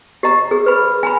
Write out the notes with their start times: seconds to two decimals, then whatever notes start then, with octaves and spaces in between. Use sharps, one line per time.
0.23 G4 D#5 A#5
0.51 G#4
0.66 B4 B5
1.03 G#5 A#5 B5